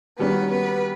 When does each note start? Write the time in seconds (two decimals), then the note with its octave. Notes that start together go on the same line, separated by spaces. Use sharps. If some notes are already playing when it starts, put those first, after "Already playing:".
0.18 D#3 G3 A#3 B3 C#4 F#4 B4
0.50 B3 B4